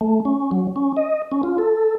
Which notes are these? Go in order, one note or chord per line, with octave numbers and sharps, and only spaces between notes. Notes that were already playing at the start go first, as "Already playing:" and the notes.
A3
C#4
F#3
C#4
D#5
C#4
F4
A4